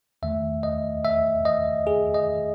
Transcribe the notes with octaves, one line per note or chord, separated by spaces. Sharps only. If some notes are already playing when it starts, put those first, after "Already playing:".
E2 D#3 A3 E5
D#5
E5
D#5
G#4
D#5